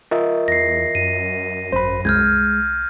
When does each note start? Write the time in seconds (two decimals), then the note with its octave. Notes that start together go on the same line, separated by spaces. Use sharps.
0.11 F4 A#4 D#5 E5
0.48 E2 A#6 C7
0.95 F#2 D#7
1.72 G#1 C5 B5
2.05 C2 G#3 F6 G6 G#6